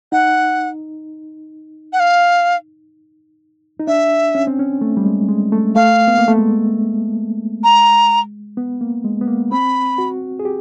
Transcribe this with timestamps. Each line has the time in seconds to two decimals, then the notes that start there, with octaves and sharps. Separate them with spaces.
0.12 D#4 F#5
1.93 F#5
2.00 F5
3.80 D#4
3.87 D4 E5
4.35 C#4
4.47 C4
4.59 C#4
4.81 A3
4.97 G3
5.05 G#3
5.29 G#3
5.52 A3
5.75 A3 F5
6.08 B3
6.18 A#3
6.28 A3
6.39 G#3
7.64 A#5
8.57 B3
8.81 A#3
9.04 G#3
9.21 B3
9.27 A#3
9.52 C4 B5
9.98 F#4
10.39 G#4
10.45 G4